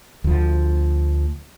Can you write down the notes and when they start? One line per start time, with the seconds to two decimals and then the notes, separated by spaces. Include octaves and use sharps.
0.24 D2 F3